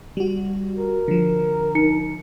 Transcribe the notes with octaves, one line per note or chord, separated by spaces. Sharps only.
G3 F#4
A#4
D3 F3
D#4 C#7